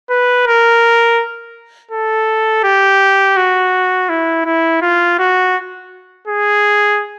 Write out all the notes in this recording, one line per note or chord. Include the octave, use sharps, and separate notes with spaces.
B4
A#4
A4
G4
F#4
E4
E4
F4
F#4
G#4